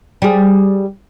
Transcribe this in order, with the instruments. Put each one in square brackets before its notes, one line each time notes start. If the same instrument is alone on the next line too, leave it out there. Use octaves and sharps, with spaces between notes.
[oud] G3 G#4